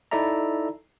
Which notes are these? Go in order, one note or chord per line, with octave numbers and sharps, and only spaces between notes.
D#4 E4 A4 D5 E5 A#5